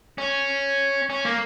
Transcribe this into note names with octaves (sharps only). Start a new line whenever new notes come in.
C#4
C#4
A#3